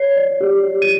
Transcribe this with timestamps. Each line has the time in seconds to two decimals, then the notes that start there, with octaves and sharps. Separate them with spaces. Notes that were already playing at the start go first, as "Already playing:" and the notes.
Already playing: C#5 C7
0.16 D5
0.41 G4
0.65 G4
0.82 D#7